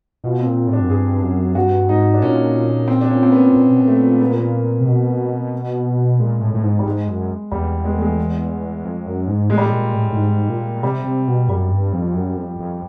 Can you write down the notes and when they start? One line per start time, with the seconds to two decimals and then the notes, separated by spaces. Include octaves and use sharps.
0.24 B2 F4
0.40 C4
0.46 A#2
0.67 A2
0.73 D4
0.80 F#2
0.90 G2 G#4
1.22 F#2
1.55 G2 F#4
1.89 G#2 D#4
2.14 D4
2.22 A#2 C#4
2.88 C4
3.01 D4
3.10 C#4
3.23 C4
3.32 B3
3.54 A#2
3.68 B2
3.80 A#2
3.88 A3
4.21 B3
4.30 A#3
4.38 B3
4.80 C3
4.86 B2
6.19 A#2 G#3
6.41 A2
6.54 A2
6.63 G#2
6.79 G3
6.86 G#2 G#3
7.08 F#2
7.51 E2 G3
7.85 G#3
7.94 A3
8.02 G#3
8.84 F2
9.06 F#2
9.28 G#2
9.50 A2 G#3
9.58 G3
9.65 G#3
9.72 A#2
9.94 A2
10.12 A2
10.16 G#2
10.49 A#2
10.83 C3 G3
11.04 C3
11.27 B2
11.49 F#2 G3
11.71 G2
11.92 F2
12.15 F#2
12.37 F2
12.59 F2